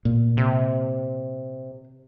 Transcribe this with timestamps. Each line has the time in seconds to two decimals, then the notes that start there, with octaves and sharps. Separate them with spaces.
0.05 A#2
0.37 C3